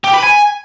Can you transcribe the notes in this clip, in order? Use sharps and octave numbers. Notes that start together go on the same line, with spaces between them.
G4
B4
G#5